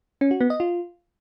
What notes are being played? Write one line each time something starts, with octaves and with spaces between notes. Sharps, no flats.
C#4
F#4
B3
D#5
F4